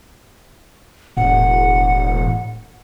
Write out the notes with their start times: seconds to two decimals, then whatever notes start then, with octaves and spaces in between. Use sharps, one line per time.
1.17 E1 A2 F#5